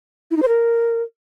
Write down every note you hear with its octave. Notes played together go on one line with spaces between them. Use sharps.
E4
D#4
C5
A#4